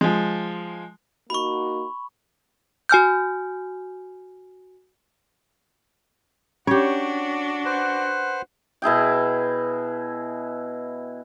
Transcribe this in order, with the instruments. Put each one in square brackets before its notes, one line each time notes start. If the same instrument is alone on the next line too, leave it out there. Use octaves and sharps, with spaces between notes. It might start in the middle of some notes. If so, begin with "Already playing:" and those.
[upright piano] F3 G#3
[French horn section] A#3 D#4 F#4 [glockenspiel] B5 C#6
[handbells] F#4 G#5 F6 G6
[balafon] C#4 [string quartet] D4 F#4 [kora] G4 C#5
[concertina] B4 C5 F#5
[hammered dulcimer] B2 E4 G#4 G5